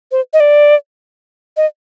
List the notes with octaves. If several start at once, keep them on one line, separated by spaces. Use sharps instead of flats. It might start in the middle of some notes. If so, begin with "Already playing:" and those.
C5
D#5
D5
D#5